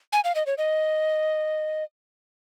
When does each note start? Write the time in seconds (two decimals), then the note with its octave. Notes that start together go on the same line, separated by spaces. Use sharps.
0.13 G#5
0.24 F5
0.35 D#5
0.46 C#5
0.58 D#5